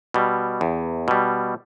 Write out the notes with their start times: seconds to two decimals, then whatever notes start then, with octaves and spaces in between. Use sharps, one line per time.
0.14 B2 G3
0.61 E2
1.08 B2 G3